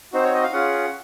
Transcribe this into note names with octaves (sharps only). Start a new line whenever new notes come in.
C4 D#4 F#4 C5
C#5
D#5
F5
C#4 F4 G#4 F#5